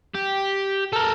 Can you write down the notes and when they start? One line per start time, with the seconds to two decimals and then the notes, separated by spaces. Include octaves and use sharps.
0.15 G4
0.93 A4 A#4